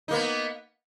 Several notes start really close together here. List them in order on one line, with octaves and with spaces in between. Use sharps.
D#4 A#3 B3